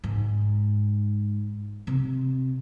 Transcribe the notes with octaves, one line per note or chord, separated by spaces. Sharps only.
G#2
C3